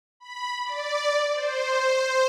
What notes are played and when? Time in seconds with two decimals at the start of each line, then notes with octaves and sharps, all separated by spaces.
0.20 B5
0.65 D5
1.33 C5